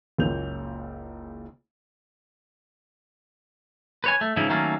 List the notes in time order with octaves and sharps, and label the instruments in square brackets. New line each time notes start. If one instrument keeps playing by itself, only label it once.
[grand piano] F#1 C#2 A#2 C#4 G6 F7
[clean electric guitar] B4 C#5 G#5
A3
G#2 C#3 E3 F3 E4
D#3 F#3 A3 A#3 C#4 D4